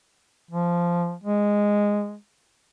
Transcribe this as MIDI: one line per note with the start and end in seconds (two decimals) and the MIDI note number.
0.51 1.14 53
1.24 2.16 56